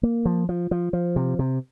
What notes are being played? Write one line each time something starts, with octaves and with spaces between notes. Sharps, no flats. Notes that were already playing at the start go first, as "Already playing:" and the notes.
A#3
F3
F3
F3
F3
C3
C3